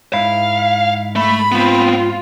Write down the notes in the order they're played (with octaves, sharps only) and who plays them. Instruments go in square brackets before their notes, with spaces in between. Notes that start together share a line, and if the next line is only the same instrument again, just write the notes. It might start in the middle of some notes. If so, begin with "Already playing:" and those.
[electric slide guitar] G#2 E4 [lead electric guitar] F5
[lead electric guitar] A3 [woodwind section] B5
[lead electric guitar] B3 C4 [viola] F4